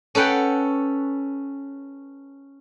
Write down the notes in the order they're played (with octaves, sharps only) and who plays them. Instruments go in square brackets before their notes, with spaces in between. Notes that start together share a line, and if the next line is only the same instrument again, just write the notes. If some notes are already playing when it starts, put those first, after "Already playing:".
[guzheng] C#4 A4 B4 F#5 G5